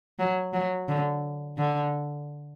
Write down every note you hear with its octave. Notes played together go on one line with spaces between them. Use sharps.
F#3
F#3
D3
D3